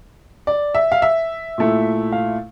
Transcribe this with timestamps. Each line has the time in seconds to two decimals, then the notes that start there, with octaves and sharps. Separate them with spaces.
0.47 D5
0.75 E5
0.92 F5
1.02 E5
1.58 A#2 A3 E4
2.12 F5